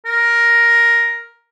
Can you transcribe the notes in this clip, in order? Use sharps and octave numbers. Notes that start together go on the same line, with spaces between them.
A#4